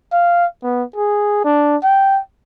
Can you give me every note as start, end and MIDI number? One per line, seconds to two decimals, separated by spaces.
0.13 0.45 77
0.63 0.83 59
0.96 1.43 68
1.44 1.76 62
1.83 2.20 79